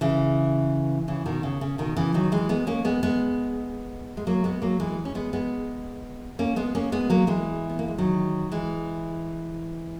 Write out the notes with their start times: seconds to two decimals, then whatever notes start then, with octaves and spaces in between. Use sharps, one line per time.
0.01 C#3 E3
1.08 C#3 E3
1.26 B2 D#3
1.43 C#3
1.61 C#3
1.78 B2 D#3
1.97 C#3 E3
2.14 D#3 F#3
2.32 E3 G#3
2.49 G#3 B3
2.67 A#3 C#4
2.85 G#3 B3
3.03 G#3 B3
4.17 G#3
4.27 F#3 A#3
4.44 G#3 B3
4.62 F#3 A#3
4.80 E3 G#3
5.05 C#4
5.15 G#3 B3
5.33 G#3 B3
6.39 A#3 C#4
6.56 G#3 B3
6.75 A#3 C#4
6.92 G#3 B3
7.10 F#3 A#3
7.27 E3 G#3
7.70 B3
7.79 A#3
7.88 G#3
7.98 D#3 F#3
8.52 E3 G#3